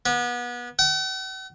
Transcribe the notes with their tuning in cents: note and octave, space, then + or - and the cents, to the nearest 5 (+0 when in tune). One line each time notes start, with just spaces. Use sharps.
B3 -30
F#5 +45